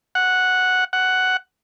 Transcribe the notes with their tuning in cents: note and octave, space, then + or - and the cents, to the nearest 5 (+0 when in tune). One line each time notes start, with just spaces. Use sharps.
F#5 -5
F#5 +5